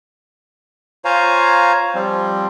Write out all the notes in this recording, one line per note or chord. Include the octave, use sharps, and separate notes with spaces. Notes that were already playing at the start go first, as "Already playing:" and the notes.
F4 C5 C#5 F5 G#5 A#5
F3 G3 C4